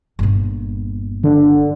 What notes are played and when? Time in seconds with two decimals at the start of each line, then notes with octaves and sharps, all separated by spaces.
0.19 G1 A#2
1.24 D3